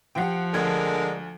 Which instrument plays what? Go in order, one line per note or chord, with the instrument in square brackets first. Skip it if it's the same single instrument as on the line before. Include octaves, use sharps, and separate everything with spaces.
[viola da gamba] F3 [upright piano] G4 F#5 G5
[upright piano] D2 G#6 [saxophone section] D3 G#3 A#4